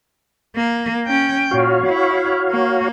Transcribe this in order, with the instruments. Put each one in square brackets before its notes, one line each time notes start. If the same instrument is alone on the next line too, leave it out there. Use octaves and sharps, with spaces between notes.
[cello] A#3
C#4 G5
[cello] A#2 [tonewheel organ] F#4 C#5 F5
[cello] E4
A#3